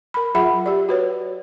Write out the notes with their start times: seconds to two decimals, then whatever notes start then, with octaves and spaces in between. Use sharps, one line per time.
0.14 A#4 B5
0.35 F#3 F4 G#4 E5 F#5 B5
0.66 G4 D5
0.89 F#4 B4 C#5